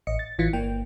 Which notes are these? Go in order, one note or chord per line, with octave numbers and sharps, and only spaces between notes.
A1 D#5 C#7
A6
A1 E3 F4 C#7
G1 A#3 G5